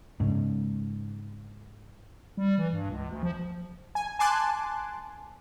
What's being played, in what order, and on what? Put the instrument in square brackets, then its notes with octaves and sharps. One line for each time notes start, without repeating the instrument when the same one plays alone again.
[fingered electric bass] G#2 C#3
[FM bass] G3
E3
G2
C#2
D2
F3
[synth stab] G#5
G#5 A5 C6 D6 F#6